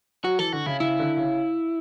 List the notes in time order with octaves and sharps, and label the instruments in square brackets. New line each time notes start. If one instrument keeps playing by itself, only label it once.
[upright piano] F#3 [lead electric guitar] F#4
[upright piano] E3 [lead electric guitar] A4
[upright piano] D3 [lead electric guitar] F#4
[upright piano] C#3 [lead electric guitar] E4
[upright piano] C#3 [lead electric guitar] E4
[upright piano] D3
C#3